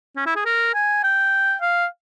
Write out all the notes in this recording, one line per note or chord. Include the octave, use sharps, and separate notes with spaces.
C#4
E4
G#4
A#4
G#5
G5
F5